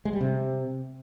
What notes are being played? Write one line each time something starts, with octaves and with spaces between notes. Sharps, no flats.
G#3
G3
C3